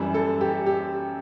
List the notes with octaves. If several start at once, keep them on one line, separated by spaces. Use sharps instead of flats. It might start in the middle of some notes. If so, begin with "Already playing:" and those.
Already playing: F#2 E3 G3
A4
G4
G4